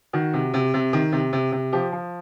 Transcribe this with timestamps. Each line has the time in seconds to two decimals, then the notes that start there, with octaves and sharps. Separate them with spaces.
0.13 D#3 F#4
0.34 C3
0.54 C3
0.74 C3
0.93 D#3
1.12 C3
1.33 C3
1.52 C3
1.73 F3 G4
1.92 F3